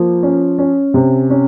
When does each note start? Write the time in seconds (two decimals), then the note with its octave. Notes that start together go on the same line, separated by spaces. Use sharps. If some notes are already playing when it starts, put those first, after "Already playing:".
Already playing: F3 A#3
0.23 C#4
0.58 C#4
0.94 C3
1.30 C#4